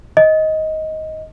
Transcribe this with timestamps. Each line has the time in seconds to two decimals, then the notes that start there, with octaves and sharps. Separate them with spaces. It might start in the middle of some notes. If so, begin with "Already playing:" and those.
0.17 D#5